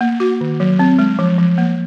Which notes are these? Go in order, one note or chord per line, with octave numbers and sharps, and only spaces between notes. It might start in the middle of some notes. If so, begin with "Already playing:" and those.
A#3
F#4
D#3
F#3
C4
G#3
F3
F3
A#3